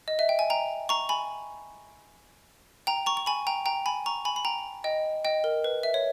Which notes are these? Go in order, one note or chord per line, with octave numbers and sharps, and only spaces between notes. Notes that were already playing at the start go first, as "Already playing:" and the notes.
D#5
E5
G5
G#5
G5 A#5
A#5 C#6
G#5 B5
G5 A#5
A#5 C#6
C#6
G#5 B5
G5 A#5
G5 A#5
G#5 B5
A#5 C#6
G#5 B5
B5
G5 A#5
D#5 G5
D#5 G5
A#4
B4
E5
C#5